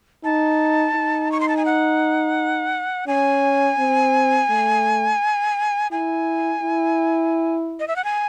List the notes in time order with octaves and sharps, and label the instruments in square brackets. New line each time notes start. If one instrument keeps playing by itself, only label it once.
[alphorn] D#4 [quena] A5
[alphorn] D#4
[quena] C#6
C6
A5
G#5
F#5
[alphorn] C#4 [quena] G#5
[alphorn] C4
A3
[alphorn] E4 [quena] G#5
[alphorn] E4
[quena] D#5
E5
F#5
G#5